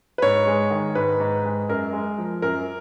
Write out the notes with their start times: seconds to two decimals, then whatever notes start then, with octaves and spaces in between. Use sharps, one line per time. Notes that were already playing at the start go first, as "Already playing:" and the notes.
0.18 B4
0.22 G#2 C#5
0.47 G#3
0.70 D#3
0.95 G#2 B4
1.20 G#2
1.45 G#3
1.69 F#2 A#4
1.93 G#3
2.18 F3
2.42 F#2 A#4